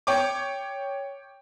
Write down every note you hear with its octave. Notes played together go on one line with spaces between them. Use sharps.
C#5 G5 D6